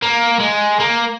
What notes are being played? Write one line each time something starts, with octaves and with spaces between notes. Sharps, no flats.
A#3
G#3
A#3